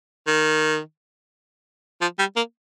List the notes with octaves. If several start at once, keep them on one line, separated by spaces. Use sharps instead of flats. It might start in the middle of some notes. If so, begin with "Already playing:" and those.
D#3
F3
G3
A#3